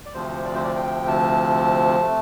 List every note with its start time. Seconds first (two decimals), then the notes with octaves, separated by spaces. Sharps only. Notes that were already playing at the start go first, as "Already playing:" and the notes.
0.06 D5
0.13 D2 C3 F3 C5
0.45 D5
0.55 C5
0.64 D5
0.76 G5
1.08 A5
2.01 C3 A3